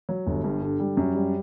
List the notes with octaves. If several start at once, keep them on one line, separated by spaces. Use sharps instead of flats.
F#3
G1
G2
D3
G3
F#2
G3